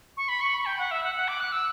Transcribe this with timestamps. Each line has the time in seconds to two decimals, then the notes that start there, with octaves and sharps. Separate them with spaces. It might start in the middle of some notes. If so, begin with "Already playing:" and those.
0.17 C#6
0.28 B5
0.41 C#6
0.54 B5
0.66 G5
0.78 F#5
0.91 E5
1.03 F#5
1.15 F#5
1.28 D6
1.40 F#6
1.52 E6